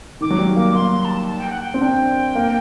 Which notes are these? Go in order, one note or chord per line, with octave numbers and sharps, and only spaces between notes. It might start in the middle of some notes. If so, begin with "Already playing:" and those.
D#3 D6
F#3
G3
A#3
A#3 C6
C6
A5
A5
G5
F#5
G5
C4
D4 G5
A#3